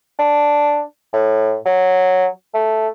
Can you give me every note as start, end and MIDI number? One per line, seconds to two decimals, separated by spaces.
0.19 0.82 62
1.13 1.57 45
1.66 2.27 54
2.54 2.88 57